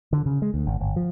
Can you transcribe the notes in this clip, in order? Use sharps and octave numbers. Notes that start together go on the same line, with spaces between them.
D3
C#3
G#3
D2
G#1
G1
F3